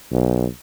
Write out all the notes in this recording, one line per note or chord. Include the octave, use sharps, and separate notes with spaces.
B1